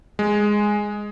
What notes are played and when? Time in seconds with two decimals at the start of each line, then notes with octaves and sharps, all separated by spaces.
0.19 G#3